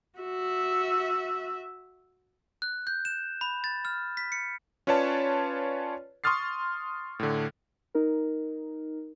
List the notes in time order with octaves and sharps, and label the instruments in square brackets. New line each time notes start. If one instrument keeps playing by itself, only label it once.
[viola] F#4 E5
[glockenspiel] F#6
G6
E7
B5
A6
F6
B6
C#7
[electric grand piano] C#4 F4 B4 C#5 D5 A5
C6 C#6 D#6 F6 A6 C7
A2 D3
[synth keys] D#4 A#4